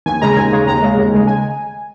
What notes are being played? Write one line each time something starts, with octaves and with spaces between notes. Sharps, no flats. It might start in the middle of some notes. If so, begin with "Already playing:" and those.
D#2 G#5
C#3 G#3 A#5
D#2 G#5
C#3 G#3
D#2 A#5
C#3 G#3
D#2
C#3 G#3
G#5